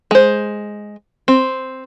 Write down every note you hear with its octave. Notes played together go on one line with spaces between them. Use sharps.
G#3 C5
C4